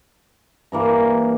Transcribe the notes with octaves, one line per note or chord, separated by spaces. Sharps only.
G2 E3 A#3